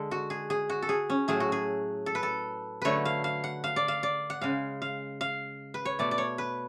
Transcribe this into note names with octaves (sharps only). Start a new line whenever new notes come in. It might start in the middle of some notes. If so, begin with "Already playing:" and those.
Already playing: D3 G#3 A4
F#4
G#4
G#4
F#4
A4
G#4
C#4
A2 F#3 A3 G#4
F#4
G#4
A4
B4
A4
D3 F#3 A3 B4 C#5
F5
F5
F#5
F5
D5
F5
D5
F#5
C#3 G#3 F5
F5
F5
B4
C#5
B2 A3 D5
D5
C#5
B4